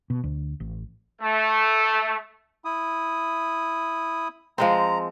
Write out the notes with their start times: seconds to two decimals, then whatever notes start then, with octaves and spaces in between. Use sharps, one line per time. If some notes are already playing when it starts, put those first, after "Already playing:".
0.10 B2
0.24 D2
0.60 A1
1.21 A3
2.65 E4 D#6
4.58 F3 G#3 C4 A#5